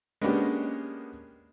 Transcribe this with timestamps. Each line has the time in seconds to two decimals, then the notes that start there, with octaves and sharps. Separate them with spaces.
0.22 G#3 A#3 B3 C#4 D4 G4